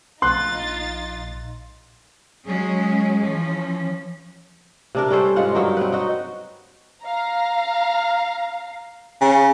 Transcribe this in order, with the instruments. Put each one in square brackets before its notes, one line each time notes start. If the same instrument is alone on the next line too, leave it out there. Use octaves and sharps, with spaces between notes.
[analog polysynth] A#1 [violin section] D#4 F4 A6 [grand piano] C6 F#6
[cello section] F#3 G#3 C#4 G#4
E3 F3 C#4
[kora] C3 D4 A#4
G3 C#4 A4 C5
G#2 G#3 F4 F#5
G2 F#3 D#4 A#4
C4 B4
D#4 F#4
[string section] F5 A#5
[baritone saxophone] C#3